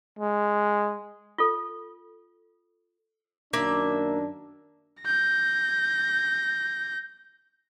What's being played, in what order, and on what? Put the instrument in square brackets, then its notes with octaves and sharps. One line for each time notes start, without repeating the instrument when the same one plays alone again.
[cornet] G#3
[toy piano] F4 A4
[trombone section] F#2 D#3 D4 [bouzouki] A#3 E5
[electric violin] G6 A#6